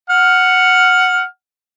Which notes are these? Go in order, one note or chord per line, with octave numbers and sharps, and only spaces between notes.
F#5 F6